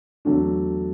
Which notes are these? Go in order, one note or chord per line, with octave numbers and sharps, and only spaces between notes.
E2 D3 F#3 A3 D4